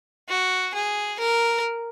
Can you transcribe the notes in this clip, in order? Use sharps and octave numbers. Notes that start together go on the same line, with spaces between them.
F#4
G#4
A#4